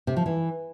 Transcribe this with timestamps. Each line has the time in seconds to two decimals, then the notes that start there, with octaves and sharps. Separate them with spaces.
0.07 C3
0.17 F3
0.26 E3